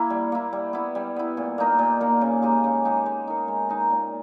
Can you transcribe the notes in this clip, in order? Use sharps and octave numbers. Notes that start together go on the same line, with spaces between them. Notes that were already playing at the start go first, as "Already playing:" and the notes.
Already playing: A#3 E4
G3
A#3 E4
G3
B3 E4
G3
B3 E4
A#2
A#3 D#4 A#4
A#2
A#3 D#4 A#4
C#3
G#3 D#4 G4
C#3
G#3 D#4 G4
G#3
D#4 A#4
G#3
D#4 A#4
A#2